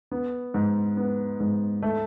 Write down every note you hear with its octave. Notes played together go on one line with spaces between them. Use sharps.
B3
G#2
B3
G#2
A3